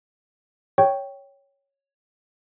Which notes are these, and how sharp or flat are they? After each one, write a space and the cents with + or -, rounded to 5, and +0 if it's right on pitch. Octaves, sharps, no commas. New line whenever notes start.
C#5 +0 G5 +0 C#6 +0